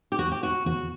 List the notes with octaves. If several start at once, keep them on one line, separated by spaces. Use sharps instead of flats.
G4
E2 F#4
G4
F#4
E2 F#4